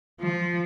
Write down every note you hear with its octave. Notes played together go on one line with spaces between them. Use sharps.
F3